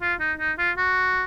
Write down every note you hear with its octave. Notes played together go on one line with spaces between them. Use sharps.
F4
D#4
D#4
F4
F#4